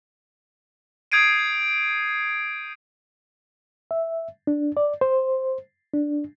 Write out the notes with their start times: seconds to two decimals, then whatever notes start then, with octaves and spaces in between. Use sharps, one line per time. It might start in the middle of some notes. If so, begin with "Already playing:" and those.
1.12 D#6 G6 G#6 C7 D7 D#7
3.91 E5
4.47 D4
4.77 D5
5.01 C5
5.94 D4